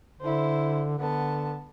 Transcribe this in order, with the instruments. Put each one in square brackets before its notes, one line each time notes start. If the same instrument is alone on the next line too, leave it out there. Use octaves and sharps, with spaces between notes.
[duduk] D3 [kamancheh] E4 C5
[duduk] D3 [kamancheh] B3 A5